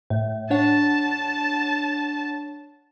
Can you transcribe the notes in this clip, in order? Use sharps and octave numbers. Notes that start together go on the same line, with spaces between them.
A2
D4 C#5 F#5 A5